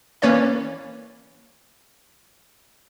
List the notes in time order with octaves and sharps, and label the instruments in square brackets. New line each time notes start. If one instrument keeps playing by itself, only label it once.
[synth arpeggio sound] E3 A#3 C#4 B4 C#5 D5